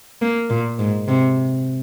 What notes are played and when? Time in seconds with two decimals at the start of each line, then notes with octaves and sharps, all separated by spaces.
0.21 A#3
0.50 A#2
0.79 G#2
1.08 C3